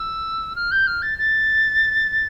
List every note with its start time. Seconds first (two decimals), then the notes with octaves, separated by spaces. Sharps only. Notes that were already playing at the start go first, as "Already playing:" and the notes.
Already playing: E6
0.56 F6
0.71 G6
0.87 F6
1.02 A6
1.18 A6